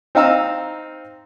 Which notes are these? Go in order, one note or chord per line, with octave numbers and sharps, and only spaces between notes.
C4 D#4 F5 A#5 E6